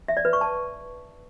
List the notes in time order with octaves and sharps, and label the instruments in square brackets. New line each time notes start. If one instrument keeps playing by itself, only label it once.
[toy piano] E5
D5
B4
C#6
A5